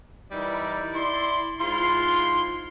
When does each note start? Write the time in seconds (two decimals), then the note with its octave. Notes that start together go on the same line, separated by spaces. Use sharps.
0.31 E3 G3 D#4 E4 A#4 D5
0.94 E4 D5 C6
1.60 G#2 E4 F4 C6